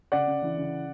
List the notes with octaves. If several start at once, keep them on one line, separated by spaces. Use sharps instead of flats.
C#3 D5 F#5
C#3
E3
C#3